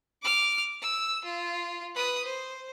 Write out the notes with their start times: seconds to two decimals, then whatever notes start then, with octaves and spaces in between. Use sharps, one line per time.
0.22 D6 F6
0.82 E6
1.24 F4
1.95 B4 D#6
2.24 C5